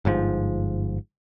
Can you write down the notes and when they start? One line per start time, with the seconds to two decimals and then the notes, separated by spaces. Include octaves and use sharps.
0.05 G1 G#2 C3 F3